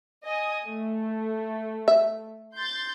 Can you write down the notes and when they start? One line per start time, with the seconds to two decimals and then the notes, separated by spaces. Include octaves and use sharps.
0.24 D#5 G#5 D#6
0.65 A3
1.88 E5
2.56 C6 G6 A6